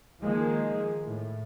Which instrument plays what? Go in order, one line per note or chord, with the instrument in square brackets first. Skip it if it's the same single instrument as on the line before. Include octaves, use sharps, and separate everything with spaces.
[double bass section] D#3 F3 G#3 A#3
A2